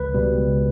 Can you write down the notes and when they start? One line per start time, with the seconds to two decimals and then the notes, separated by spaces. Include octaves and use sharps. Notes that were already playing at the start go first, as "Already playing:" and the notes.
Already playing: C#2 B4
0.14 B2 G3
0.37 C#2